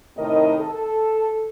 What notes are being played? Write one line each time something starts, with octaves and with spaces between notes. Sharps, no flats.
A2 C3 D#3 A#4 D#5
A4